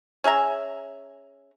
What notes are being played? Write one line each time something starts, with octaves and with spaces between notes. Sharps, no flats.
C#4 G#4 E5 A#5